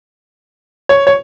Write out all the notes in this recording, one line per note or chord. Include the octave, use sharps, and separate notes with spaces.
C#5
C#5